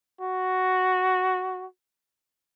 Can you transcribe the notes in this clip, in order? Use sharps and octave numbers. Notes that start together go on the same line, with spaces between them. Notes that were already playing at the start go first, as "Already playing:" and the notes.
F#4